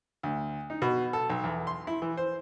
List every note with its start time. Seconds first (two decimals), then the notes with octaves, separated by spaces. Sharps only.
0.23 D2
0.70 D#4
0.82 B2
1.13 A4
1.30 B1
1.44 E2
1.67 C6
1.87 E4
2.02 E3
2.17 C5